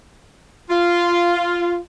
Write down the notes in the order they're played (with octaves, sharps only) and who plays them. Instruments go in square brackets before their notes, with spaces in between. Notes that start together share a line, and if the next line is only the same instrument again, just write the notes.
[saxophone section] F4